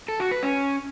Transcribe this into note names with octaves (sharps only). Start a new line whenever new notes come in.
A4
F#4
B4
C#4